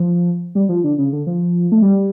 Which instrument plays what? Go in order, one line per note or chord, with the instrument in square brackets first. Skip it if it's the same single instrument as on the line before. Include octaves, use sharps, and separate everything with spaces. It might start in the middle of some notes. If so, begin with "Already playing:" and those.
Already playing: [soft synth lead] F3
G3
F3
D3
C#3
D3
F3
A3
G3